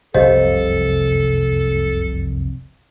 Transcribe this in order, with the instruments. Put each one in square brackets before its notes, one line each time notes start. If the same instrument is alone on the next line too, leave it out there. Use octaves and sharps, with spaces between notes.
[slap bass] F1 C2 F#2 [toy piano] G4 D#5 F5 [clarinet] A4 [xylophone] C5